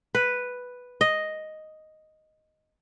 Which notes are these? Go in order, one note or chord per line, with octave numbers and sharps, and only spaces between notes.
B4
D#5